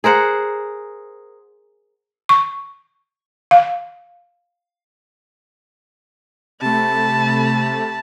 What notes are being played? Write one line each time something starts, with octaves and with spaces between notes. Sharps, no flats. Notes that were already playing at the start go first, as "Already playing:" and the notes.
G#4 A#4 C5 F#5
C#6
F5
C3 A3 A5 B5